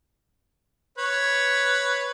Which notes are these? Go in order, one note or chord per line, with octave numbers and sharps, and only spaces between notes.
B4 C#5